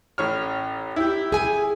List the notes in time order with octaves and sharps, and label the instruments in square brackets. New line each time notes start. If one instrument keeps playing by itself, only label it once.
[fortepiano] A1 C#5 F6
E4 G4
[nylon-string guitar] G#4 G#5